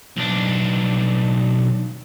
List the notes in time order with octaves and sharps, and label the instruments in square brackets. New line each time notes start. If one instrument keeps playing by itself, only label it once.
[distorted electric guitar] B1 D4